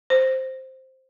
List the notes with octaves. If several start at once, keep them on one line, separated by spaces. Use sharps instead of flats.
C5